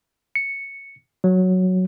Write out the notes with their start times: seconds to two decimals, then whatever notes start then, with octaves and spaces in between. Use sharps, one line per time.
0.35 C#7
1.24 F#3